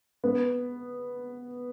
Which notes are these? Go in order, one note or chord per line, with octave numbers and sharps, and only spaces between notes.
B3